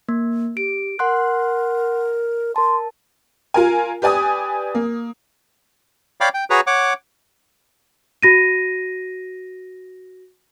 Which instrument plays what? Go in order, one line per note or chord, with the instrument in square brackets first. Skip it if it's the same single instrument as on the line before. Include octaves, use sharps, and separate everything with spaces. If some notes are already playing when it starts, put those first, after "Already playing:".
[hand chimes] A#3
[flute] G4 [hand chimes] D7
[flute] A#4 [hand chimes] F#5 C6 F#6
[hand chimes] A#4 A5 [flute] C6
[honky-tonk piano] F4 A#4 G#5
G4 B4 D5 G#5 D#6
A#3
[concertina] C#5 D5 F5 G5 B5 D6
G5
F#4 G#4 B4 C#5 A#5
C#5 F#5 D6
[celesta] F#4 A#6 D#7